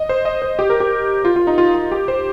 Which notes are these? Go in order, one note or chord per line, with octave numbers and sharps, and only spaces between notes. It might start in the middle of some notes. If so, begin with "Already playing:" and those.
Already playing: D#5
C5
D#5
C5
G4
A#4
G4
F4
F4
D#4
F4
F4
G4
C5